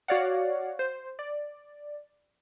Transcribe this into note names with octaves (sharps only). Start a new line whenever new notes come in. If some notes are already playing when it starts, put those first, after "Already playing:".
F#4 C#5 D5 F5 F#5
C5
D5